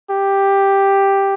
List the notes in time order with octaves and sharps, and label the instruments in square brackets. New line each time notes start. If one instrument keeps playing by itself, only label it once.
[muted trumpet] G4